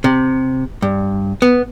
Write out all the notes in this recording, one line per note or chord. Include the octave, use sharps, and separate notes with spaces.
C3
G2
B3